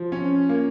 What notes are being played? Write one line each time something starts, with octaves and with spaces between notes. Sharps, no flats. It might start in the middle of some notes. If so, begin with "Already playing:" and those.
Already playing: F3
C#4
A#3